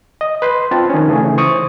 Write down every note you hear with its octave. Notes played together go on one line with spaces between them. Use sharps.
D#5
B4 C6
C4 F4 A5
D#3 C#4
C#3 E3 A3 G#4
C5 C#6 D#6